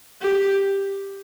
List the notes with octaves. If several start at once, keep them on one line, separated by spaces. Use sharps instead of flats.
G4